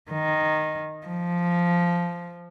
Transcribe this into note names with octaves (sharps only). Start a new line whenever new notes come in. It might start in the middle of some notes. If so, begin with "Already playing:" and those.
D#3
F3